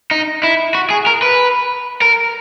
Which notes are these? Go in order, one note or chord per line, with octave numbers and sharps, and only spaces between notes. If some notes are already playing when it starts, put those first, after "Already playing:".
D#4
E4
F#4
G#4
A#4
B4
A#4